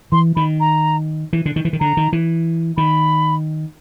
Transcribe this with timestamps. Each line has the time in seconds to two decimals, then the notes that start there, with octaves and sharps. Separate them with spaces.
0.12 E3 C6
0.36 D#3 B5
0.60 A#5
1.33 E3
1.46 D3
1.56 D#3
1.65 E3
1.73 D#3
1.80 D3 A#5
1.97 D#3
2.13 E3
2.77 D#3 B5